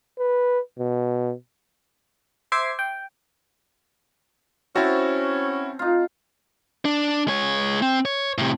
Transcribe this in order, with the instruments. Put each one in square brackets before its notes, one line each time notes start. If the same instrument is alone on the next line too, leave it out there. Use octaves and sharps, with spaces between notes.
[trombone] B4
B2
[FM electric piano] C5 E5 D6 G#6 C7
G5
[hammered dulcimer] C4 A5 A#5 [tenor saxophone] C#4 [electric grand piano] E4 F#4
[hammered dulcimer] D#4 F4
[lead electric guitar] D4
G#3 C#5
C4
C#5
A2 C3